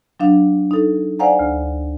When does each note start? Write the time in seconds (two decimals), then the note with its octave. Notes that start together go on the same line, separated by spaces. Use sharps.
0.19 F#3 D4 F5
0.71 D#4 A4
1.19 C5 D5 F5 F#5 G#5 A#5
1.39 D2